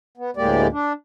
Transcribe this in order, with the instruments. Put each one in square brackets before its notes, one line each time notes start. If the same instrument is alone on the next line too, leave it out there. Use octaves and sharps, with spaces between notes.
[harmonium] B3
D2 A2 G#3 A#3 G4 D5
D4